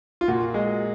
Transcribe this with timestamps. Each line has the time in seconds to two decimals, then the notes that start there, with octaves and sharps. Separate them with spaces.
0.21 F4
0.28 A#2 F#4
0.54 G#3